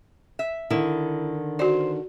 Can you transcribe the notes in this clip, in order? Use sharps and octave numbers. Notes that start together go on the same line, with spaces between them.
E5
D3 D#3 E4
F#4 C5 D5